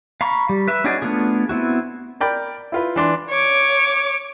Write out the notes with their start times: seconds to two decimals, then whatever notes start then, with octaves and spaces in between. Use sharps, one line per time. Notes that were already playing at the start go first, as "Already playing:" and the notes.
0.21 F5 A#5 B5 C#6
0.49 G3
0.68 B4 E5
0.84 C#4 D#4 F#4 G#4 D5
1.02 A3 B3 D4 F4 G#4
1.49 B3 C4 E4 F#4
2.20 A#4 D5 G5 B5
2.72 E4 F4 B4
2.96 E3 D4 C6
3.30 C#5 D6